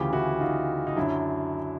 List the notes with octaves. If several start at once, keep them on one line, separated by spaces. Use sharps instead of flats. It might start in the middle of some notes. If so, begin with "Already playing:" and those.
Already playing: D2 C#3 E3 F4 G4
E4 F#4
D#4 F4
D#4
F#2 D3 F#3 D4 E4